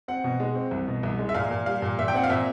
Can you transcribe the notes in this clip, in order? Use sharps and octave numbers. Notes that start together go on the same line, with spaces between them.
C4 F#5
B2
G#3
C4
C2
B2
C2
G#3
E5
A#2 F5
A#2
G3 F5
A#2
A#2 E5
G5
C4 F#5
F5
A#2 E5